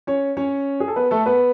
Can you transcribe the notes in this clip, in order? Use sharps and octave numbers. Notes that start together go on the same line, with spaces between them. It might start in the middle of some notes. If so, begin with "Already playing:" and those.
C#4 C#5
C#4 C#5
G#4
A4
B3 B4
A3 A4
B3 B4